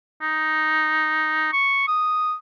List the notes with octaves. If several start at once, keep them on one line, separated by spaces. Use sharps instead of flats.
D#4
C#6
D#6